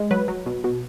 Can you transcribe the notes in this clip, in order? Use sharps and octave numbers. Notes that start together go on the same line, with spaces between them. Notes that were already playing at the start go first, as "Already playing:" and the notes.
Already playing: G#3
F#3 B4
F#3
B2
B2